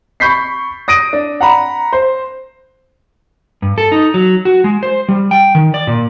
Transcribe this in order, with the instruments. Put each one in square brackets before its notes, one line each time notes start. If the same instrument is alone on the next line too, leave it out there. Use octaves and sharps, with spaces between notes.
[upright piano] B5 C#6 G6 B6 C7
D#6 A#6 D7 D#7
D4
F#5 A#5 B5
C5
[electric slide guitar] G2
A4
D#4
F#3
F#4
G#3
C5
G3
G5
D#3
D5
A#2